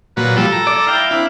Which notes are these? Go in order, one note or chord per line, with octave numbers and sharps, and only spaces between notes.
A#2 F#3 B4
F3 G3 A4
A#5
D5
E4 F5 G5
C4 D4 E4